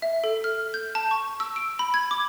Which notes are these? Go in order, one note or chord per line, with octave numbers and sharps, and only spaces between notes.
E5
A4
F6
G6
A5
C#6
E6
D7
B5
G#6
D6